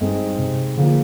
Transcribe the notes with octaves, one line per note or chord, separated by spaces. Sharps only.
G2 G#3 C4 D#4 G#4
C3
D3 F3 A#3 F4 G#4